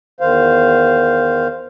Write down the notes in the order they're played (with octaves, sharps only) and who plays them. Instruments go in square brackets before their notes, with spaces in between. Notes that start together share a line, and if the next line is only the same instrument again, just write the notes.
[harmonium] E2 D#3 C5 F5